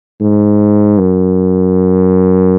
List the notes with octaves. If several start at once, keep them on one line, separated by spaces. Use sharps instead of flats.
G#2
F#2